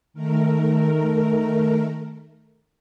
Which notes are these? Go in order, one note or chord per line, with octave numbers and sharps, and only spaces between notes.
D#3 A3 A#4